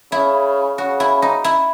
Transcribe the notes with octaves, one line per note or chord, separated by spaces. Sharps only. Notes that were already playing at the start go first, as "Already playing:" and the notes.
C#3 E4
C#3 F#4
E4
D#4
E4